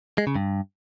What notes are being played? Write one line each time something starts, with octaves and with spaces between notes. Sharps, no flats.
G#3
C#3
G2